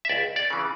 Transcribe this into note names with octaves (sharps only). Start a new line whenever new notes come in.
E5
C#2 D5
D5
C#3 E3